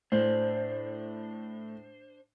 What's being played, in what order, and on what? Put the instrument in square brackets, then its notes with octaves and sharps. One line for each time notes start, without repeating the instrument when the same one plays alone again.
[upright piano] A2 [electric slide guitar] D4 C5